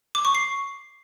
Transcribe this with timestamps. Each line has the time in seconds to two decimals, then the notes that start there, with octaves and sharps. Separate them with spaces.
0.15 D6
0.25 C#6
0.35 C7